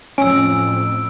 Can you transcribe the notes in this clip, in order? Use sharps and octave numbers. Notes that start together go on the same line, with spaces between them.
F2 A2 C#4 E6 D7